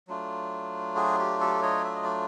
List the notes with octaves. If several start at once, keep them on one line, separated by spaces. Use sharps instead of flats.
F#3 A3 D4 F4
F#4 G#4
G4
G4 A4
C#5 D#5
E5
D#5
D5